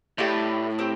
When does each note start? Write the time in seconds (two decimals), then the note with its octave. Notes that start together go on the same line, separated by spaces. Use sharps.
0.18 A2 A3 E4 G4 D5
0.79 C4 G4